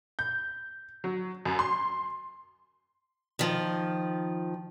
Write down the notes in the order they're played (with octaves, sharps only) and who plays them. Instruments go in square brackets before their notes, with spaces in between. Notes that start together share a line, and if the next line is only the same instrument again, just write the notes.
[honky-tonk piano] G6
F#3
F#2
C6
[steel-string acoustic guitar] D#3 F3